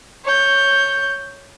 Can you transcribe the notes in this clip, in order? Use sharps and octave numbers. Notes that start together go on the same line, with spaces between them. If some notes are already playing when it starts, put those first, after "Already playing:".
C#5 G6